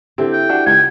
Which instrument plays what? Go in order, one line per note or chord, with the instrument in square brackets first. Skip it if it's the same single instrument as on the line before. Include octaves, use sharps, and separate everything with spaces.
[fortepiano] D3 C4 [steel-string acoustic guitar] E4 G4
[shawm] G5
[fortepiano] D4 F#4
[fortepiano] C#2 [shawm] G5 [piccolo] G#6